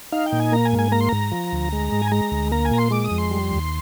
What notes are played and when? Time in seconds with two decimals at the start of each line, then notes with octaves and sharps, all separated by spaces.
0.12 D#4 F5
0.26 G5
0.32 A#2
0.40 G#5
0.52 A#3 A#5
0.65 G#5
0.73 G#2
0.79 G#5
0.92 A#3 A#5
1.01 C6
1.09 G#2 A#5
1.32 F3
1.52 D2
1.73 G#3
1.92 G#2
2.02 G#5
2.12 G#3 A#5
2.32 D2
2.52 A#3 A#5
2.65 G#5
2.71 A#2 A#5
2.78 C6
2.91 G#3 D6
3.04 D#6
3.11 F2
3.18 C6
3.31 G3
3.51 D#2